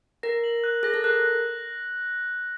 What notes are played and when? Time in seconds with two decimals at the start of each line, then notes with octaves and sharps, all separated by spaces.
0.23 A#4 A#6
0.44 F#7
0.64 F#6
0.83 G#4 A#6
0.94 A4
1.04 A#4 F#6